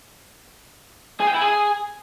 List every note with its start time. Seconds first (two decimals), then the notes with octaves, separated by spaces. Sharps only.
1.20 G#4
1.27 G5
1.34 E4
1.41 G#4